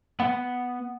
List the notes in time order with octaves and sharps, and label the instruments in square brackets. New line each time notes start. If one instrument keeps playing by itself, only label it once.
[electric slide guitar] B3 F#5